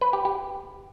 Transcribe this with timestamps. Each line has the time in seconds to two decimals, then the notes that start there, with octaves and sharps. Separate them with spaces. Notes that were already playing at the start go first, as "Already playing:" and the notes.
0.01 B4
0.13 G4
0.25 G4